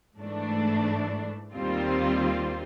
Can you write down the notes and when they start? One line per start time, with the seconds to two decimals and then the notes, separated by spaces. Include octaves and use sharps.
0.18 G#2 E3 A3 D4
1.55 D#2 D#3 G3 C4 F4